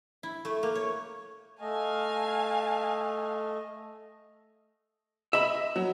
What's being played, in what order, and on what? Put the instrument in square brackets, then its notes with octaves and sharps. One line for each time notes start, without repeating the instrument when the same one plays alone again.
[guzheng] E4
A3
A#3
C#5
[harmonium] A3 D#5 [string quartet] F5 G#5 A5
[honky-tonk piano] D#5 [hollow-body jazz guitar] E5 B5
[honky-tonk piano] F#3